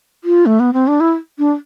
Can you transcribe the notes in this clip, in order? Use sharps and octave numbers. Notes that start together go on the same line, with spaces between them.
F4
A3
B3
C4
D4
E4
D4